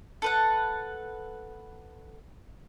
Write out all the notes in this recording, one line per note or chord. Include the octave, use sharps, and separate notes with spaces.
A4 B4 F#5